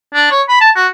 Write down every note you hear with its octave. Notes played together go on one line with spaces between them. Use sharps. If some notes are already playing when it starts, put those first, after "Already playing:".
D4
C#5
B5
A5
F#4